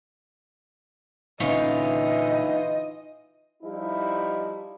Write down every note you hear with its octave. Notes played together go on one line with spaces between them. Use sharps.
A#2 D3 E3 C#4 D#4 F4 C#5 D#5
F3 G3 D#4 E4